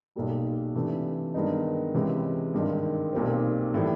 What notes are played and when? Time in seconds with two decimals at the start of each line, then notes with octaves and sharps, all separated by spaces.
0.16 B1 A#2 G3 A#3
0.75 C3 E3 A3 D4
1.34 G2 D#3 G#3 B3 D#4
1.94 C#2 C3 E3 G#3 C#4
2.54 G#1 G2 D#3 G#3
3.13 B1 A#2 G3 C4
3.74 A2 E3 G3